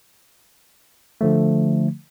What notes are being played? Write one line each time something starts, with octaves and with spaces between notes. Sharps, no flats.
D3 F3 A3